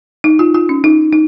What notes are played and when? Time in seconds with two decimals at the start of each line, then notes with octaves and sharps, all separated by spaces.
0.24 D#4
0.39 F4
0.54 F4
0.69 C#4
0.84 D#4
1.12 D#4